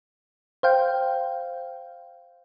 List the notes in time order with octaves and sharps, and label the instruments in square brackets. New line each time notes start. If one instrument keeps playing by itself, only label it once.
[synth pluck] C5 F5 G5